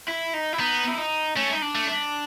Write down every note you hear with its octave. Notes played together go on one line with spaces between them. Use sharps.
E4
D#4
E4
B3 D#4
E4
D#4
A3 C#4
D#4
D4
A3
D4